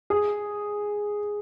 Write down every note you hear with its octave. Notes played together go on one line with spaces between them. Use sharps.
G#4